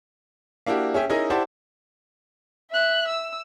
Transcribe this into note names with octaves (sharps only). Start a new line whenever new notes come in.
A#3 D4 E4 F#4 G4
C#4 G#4 E5 G5
C#4 D#4 E4 G#4 A#4 D#5
E4 G4 C5 D5 F#5 A5
E5 F#6
E6